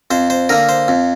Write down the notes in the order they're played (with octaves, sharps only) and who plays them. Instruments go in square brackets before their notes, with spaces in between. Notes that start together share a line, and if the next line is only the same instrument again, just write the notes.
[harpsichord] F2 C5
C5
D3 A#3 A#4
C5
F2